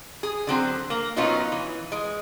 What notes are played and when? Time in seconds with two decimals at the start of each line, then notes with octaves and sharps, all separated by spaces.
0.23 G#4
0.47 D3 F#3 C4 F#4
0.90 A#3
1.17 B2 F#3 B3 C#4 D#4 F4
1.52 E3
1.92 G#3